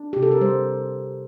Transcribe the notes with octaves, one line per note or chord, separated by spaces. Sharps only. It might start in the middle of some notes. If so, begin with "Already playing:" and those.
Already playing: D4
C3 G4
A4
A#4
G3 C5